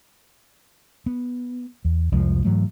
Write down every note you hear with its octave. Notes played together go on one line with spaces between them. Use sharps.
B3
E2
C2 F2 F3 G#3
G#2 E3 F#3 A3